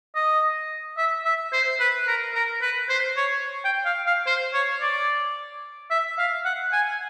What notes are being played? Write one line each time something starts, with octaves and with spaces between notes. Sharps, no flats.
D#5
E5
E5
C5
B4
A#4
A#4
B4
C5
C#5
G5
F5
F5
C5
C#5
D5
E5
F5
F#5
G#5